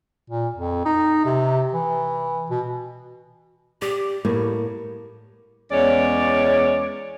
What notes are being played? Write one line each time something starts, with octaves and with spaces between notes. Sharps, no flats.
A#2
F2
D#4
C3
E3
B2
G4 D5
A2 A#3 B3
E2 G#3 C#4 C#5 D5